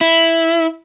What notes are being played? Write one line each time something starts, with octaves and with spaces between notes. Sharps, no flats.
E4